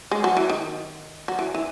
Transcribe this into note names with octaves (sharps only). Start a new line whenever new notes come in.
G#3
F#3
E3
D#3
F#3
E3
E3